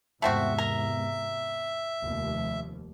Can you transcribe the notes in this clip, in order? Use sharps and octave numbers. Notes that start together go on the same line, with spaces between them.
E2 G#2 C3 A3 C4 F#4 E5
A#4
F1 D#2 F3